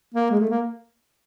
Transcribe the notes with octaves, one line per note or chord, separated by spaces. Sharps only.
A#3
G#3
A3
A#3